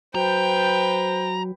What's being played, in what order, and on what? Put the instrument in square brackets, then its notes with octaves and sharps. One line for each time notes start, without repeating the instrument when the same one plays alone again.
[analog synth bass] F#3 [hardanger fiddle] B4 G5 [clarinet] C5 [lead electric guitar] A#5